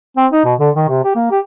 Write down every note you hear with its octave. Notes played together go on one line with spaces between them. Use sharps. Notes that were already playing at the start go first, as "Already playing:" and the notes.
C4
D#4
B2
D3
D#3
C3
G4
A#3
G4